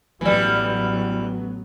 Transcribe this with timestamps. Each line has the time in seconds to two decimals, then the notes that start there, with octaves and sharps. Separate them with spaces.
0.21 A1 E3 F#3 G3 B3